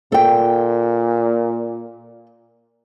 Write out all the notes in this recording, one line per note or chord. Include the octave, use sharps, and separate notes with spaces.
A#2 A4 G5